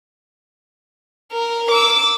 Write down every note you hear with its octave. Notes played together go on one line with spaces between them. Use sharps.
A#4
D6 E6